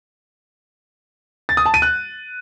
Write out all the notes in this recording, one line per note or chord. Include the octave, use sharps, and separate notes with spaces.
A6
D#6
A5
D#7
F#6